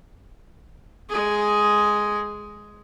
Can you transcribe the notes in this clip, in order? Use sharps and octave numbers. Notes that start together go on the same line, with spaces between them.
G#3 G#4